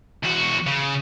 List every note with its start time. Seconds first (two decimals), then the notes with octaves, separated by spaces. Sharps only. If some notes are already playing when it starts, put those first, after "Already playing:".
0.23 E2 F#4
0.67 C#3